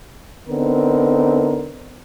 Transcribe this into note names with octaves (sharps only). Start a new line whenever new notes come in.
D3 B3 C4 D#4 A#4